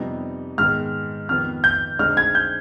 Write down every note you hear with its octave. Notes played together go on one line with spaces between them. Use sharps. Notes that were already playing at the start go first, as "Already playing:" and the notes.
Already playing: F2 C3 G3 B3 D#4
G#2 D#3 G#3 B3 F6
F2 D#3 B3 F6
G6
D3 G#3 C4 D#4 F6
G#6
G6